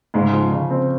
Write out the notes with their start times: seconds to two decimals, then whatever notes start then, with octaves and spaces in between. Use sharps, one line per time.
0.14 G#2 C#3 G#3
0.33 F3
0.52 C#3
0.71 C4